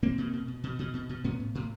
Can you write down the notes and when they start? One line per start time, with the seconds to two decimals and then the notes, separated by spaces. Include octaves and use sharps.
0.02 B2 A#3 C4
0.18 B2
0.33 B2
0.48 B2
0.63 B2
0.79 B2
0.94 B2
1.09 B2
1.24 A2 B3 C#4
1.40 A2
1.55 A2